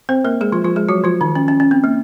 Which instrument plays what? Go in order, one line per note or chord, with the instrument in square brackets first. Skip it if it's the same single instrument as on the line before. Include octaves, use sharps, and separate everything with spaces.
[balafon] C4 C5
A#3 A#4
G#3 G#4
F3 F4
F3 F4
G#3 G#4
F#3 F#4
F3 F4
D#3 D#4
C#4
C#4
C#4
C4
A#3